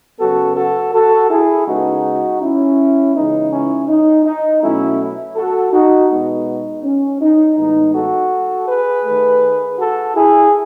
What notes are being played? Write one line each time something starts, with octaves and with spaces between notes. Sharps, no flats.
C#3 F#3 B3 F#4 A4
F#4 A4
F#4 A4
E4 G#4
C#3 G#3 B3 D#4 F#4
C#4 E4
C#3 E3 G#3 B3 D#4
C#4 E4
D#4
D#4
B2 F#3 A3 C#4 E4
F#4 A4
D#4 F#4
B2 G#3 B3 D#4
C#4
D#4
A2 E3 G#3 B3 D#4
F#4 A4
G#4 B4
D#3 A3
F#4 A4
E4 G#4